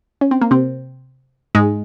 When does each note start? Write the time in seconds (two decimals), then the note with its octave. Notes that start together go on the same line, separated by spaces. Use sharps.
0.21 C#4
0.31 C4
0.41 A#3
0.51 C3 C4
1.55 G#2 G#3